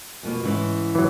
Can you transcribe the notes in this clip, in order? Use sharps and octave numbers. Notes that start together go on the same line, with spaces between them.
F2 B2 A#3
G#2 C#3 E3
E3 F#3